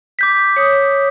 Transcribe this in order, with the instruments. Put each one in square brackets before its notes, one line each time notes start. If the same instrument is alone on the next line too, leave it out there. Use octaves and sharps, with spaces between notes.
[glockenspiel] D6 G6 B6
[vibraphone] C#5 D#6